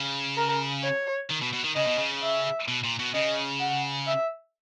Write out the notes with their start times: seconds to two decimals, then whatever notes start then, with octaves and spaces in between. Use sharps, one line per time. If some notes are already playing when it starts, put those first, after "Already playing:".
Already playing: C#3
0.37 A#4
0.83 C#5
1.30 D#3
1.42 B2
1.53 B2
1.64 D#3
1.75 C#3 D#5
1.87 B2
1.98 C#3
2.22 E5
2.68 B2
2.84 A#2
2.99 B2
3.14 C#3 D#5
3.60 F#5
4.07 E5